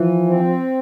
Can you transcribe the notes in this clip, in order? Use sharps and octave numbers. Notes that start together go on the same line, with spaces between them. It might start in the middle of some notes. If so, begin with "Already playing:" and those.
Already playing: E3 F3
C4